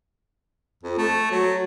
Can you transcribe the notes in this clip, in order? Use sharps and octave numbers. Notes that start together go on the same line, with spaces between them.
F2
A3
F#3